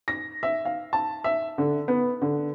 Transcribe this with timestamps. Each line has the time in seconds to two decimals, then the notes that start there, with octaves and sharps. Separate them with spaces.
0.08 A#6
0.43 E5
0.65 F5
0.93 A5
1.24 E5
1.58 D3
1.88 B3
2.22 D3